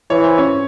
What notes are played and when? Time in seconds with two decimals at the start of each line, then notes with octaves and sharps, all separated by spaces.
0.10 E3 C#5
0.24 C5
0.38 C#4 C#5